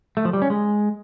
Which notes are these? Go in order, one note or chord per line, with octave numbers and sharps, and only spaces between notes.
A3
F3
G3
C#4
G#3